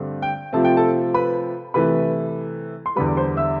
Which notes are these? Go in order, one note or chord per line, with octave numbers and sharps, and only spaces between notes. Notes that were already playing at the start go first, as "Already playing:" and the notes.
Already playing: G2 D3 A3 C4
G5
C3 F3 A3 C4 A5
G5
A4 A5
B4 B5
C3 E3 A3 B4 B5
C6
E2 D3 G3 B4 B5
D6
C5 C6
E5 E6